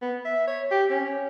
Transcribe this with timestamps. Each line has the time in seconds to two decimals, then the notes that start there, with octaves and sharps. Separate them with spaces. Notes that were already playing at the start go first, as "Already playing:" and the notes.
0.02 B3
0.25 E5
0.48 C#5
0.71 G4
0.90 C#4